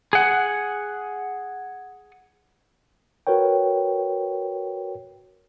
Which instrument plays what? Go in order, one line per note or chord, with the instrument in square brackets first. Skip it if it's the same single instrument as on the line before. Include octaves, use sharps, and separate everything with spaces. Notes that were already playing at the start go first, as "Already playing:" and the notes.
[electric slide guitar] G#4 F#5
[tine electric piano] F#4 A#4 B4 C#5 G5